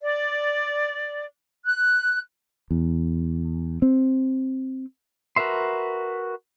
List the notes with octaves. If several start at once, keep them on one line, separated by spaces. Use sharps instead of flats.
D5
F#6
E2
C4
F#4 A#4 B4 E5 C6